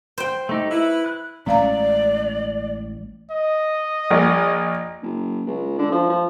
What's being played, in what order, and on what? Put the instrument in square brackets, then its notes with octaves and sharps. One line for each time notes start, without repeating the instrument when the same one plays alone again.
[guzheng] C5 G5
[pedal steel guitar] A3 D#4 G4
[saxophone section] E4 [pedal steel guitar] B4
[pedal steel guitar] F#6
[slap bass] A1 G#3 A3 [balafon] C#4 F5 A#5 [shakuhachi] D5
[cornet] D#5
[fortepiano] A#1
[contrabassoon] F#1
C#2
D3
F3
F3